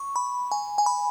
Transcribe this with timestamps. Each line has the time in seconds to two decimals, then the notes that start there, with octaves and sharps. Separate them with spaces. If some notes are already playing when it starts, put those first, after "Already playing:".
Already playing: C#6
0.16 B5
0.52 G#5
0.78 G#5
0.86 B5